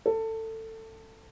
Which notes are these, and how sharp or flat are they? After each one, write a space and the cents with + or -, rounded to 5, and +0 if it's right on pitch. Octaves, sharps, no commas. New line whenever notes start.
A4 +20